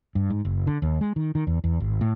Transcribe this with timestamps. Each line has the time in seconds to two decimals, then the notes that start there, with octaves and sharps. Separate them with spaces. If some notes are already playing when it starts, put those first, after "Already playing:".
0.15 G2
0.30 G#2
0.45 F#1
0.67 D3
0.82 D#2
1.01 G#3
1.16 D#3
1.35 D#3
1.47 E2
1.64 E2
1.80 G#1
2.01 A2